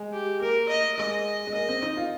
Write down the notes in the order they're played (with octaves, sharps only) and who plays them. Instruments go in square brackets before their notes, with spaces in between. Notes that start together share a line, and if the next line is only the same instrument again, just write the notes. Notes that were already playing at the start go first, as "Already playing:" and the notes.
Already playing: [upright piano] G#3
[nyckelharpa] G4
[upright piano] A#3 [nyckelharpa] A#4
[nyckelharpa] D#5
[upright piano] G#3 [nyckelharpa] D#5
[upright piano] G#3
[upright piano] A#3 [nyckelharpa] D#5
[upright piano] C4
D#4
F4